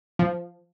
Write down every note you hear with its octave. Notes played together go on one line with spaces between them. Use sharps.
F3